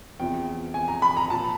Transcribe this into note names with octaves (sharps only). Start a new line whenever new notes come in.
E2 C3 F3 G5
G#5
A#5
B5
A#5
A#2 F3 A5